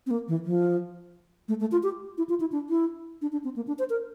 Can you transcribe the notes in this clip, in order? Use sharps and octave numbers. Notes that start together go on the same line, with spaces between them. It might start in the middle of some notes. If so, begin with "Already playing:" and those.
C4
A#3
E3
F3
A3
A3
F4
G4
E4
F4
E4
D4
E4
D4
D4
C4
A#3
D4
C5
A#4